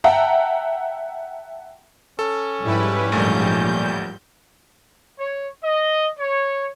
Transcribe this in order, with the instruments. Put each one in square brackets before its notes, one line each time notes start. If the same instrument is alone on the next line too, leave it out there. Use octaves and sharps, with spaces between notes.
[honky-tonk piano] E5 F#5 G5 A5 A#5
[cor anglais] C#4 [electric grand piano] A4
[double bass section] G#2 F3 [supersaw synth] G3 E4 B4
[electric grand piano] A1 D2 A3 [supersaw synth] A#2 G3 G6
[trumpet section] C#5
D#5
C#5